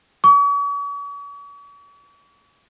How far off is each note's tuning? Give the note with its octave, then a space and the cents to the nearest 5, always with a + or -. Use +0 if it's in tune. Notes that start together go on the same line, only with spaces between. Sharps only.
C#6 +45